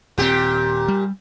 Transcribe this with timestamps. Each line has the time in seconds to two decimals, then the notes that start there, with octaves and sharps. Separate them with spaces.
0.18 D#1 A#2 C4 G4
0.88 G3